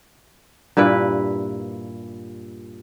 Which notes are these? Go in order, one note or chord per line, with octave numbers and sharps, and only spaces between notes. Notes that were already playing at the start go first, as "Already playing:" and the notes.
G2 A#2 E4 B4